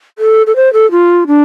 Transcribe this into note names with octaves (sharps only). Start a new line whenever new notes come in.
A4
A4
C5
A4
F4
D4